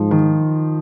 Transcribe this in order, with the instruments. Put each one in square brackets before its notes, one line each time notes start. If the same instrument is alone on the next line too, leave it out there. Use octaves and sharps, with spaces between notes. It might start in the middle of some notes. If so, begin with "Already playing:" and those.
Already playing: [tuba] G#2 [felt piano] F3
[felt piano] D#3